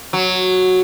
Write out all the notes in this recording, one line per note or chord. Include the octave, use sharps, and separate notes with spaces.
F#3